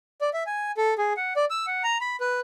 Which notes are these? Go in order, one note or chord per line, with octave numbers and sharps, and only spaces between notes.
D5
E5
G#5
A4
G#4
F#5
D5
E6
F#5
A#5
B5
B4